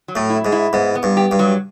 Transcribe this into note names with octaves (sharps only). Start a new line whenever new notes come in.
F#3
A2
E4
G#2
E4
G#2 B3
B3
G2
G4
G2
F#3